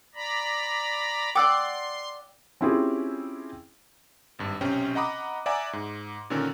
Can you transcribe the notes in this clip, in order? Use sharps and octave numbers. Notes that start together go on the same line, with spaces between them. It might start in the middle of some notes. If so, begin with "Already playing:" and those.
D5 A#5 B5
D5 F#5 G5 C6 D6 E6
C4 C#4 E4 F4 G4 G#4
G#1 G2
B1 C3 C4 C#4 G5
D#5 F#5 A#5 B5 D6 D#6
D5 E5 F#5 G#5 A#5 D6
G#2
A#2 D3 D#3 C#4 A4 A#4